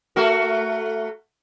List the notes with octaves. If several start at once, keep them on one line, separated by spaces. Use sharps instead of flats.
A3 F#4 A#4